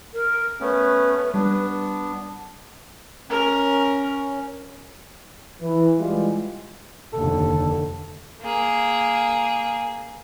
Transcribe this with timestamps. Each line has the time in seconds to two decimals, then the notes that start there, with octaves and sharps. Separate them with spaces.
0.13 A#4
0.60 A3 B3 C#4 B4
1.34 G3 B3 D4
3.30 C#4 A#4
5.61 E3
5.99 E3 G3 G#3 F4 G4 G#4
7.13 F1 D#2 D3 A4
8.41 A#3 G#4